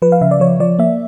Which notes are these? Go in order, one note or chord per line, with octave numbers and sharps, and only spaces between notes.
F3 B4
F5
C#3 E5
D5
F3 C#5
F3 D5
A#3 E5